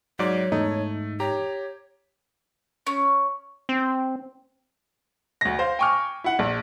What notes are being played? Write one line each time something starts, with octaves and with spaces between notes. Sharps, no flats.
G#2 F#3 C#5 D5 D6
E2 G#2 A3 D#4
G4 C#5 A#5
C#4
C4
D2 A#6
C5 F5
G5 G#5 C#6 D6 F6
E4 F#5
A#1